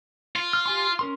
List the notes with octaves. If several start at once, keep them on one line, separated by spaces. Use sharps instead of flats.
F4
F6
G4 G#5 C6
C#4 A#4 C6